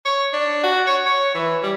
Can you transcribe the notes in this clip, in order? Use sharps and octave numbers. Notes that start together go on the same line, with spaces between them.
C#5
D4
F#4
C#5
C#5
E3
G3